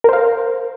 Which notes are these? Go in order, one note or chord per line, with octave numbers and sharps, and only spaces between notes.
A#4 C5 F5